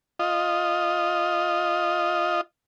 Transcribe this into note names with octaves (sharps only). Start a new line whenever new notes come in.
F4 D#5